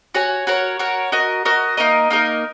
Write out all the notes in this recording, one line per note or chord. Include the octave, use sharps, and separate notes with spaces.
F#4 C#5 G#5
F#4 A#4 C#5
F#4 A#4 C#5
F#4 A#4 D#5
F#4 A#4 D#5
A#3 D#4 A#4 D#5
A#3 D#4 A#4 D#5